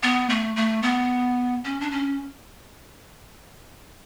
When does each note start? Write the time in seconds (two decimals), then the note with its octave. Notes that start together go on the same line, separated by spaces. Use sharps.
0.03 B3
0.30 A3
0.56 A3
0.83 B3
1.64 C#4
1.81 D4
1.91 C#4